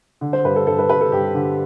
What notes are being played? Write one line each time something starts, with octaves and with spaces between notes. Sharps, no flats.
D3
C5
G2 B4
A4
G2 A4
B4
G2 B4
A4
G2 G4
D3